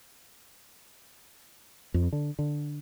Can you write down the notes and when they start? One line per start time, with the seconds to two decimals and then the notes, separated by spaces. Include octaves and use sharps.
1.94 F2
2.12 D3
2.39 D3